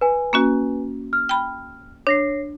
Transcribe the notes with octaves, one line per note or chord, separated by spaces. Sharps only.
B4 G#5
A#3 C#4 F#4
F6
G5 B5
D4 C#5 A#6 C7